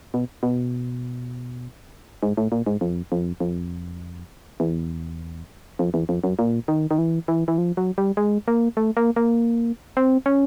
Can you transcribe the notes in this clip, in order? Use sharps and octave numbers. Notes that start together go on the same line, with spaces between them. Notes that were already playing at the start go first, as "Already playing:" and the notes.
B2
B2
G#2
A2
A#2
G#2
F2
F2
F2
E2
F2
E2
F2
F#2
A#2
D#3
D#3
E3
E3
E3
F3
F#3
G3
G#3
A#3
A3
A#3
A#3
C4
C#4